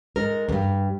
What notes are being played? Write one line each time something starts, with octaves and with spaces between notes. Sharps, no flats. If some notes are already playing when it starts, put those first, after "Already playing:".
G#2 A#4
E2 G2